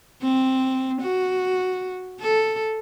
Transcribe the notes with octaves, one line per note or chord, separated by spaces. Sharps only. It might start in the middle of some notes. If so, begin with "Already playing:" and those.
C4
F#4
A4